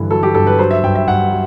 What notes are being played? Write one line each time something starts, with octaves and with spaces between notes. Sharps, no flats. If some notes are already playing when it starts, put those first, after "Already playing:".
Already playing: G2 D3 E3
F#3 A4
G4
G2 A4
B4
F#3 C5
E5
G2 G5
E5
G2 F#5
F#3